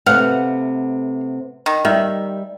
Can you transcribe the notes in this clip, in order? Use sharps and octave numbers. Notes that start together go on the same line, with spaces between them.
C3 A3 B3 F5 F#5
D#3
D#3 G3 E5